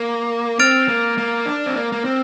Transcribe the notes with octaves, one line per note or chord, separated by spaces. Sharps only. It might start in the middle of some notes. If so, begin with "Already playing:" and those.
Already playing: A#3
C4 F6 A6 D7 F7
A#3
A#3
D4
C4
A#3
A#3
C4